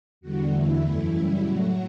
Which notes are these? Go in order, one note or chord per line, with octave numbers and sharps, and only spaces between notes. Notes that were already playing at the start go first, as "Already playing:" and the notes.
E2 D3 G3 F#4
E2 D3 A3 E4
F#2 E3 A3 E4
F#2 C#3 G3
A2 F#3 A3 F#4